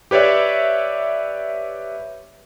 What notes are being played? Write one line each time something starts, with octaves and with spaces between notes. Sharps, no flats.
G4 B4 C#5 D5 E5